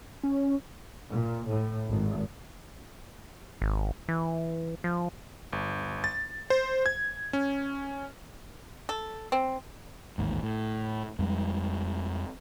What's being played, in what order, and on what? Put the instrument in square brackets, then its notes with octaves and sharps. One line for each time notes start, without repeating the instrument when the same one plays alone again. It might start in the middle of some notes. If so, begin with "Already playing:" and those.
[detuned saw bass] C#4
[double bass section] A#2
A2
G#1
[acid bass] G#1
E3
F3
[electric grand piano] G1
A6
C5
G#6
C#4
[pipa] A4
C4
[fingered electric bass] A1 D#2 G#2
A2
F2 G3 G#3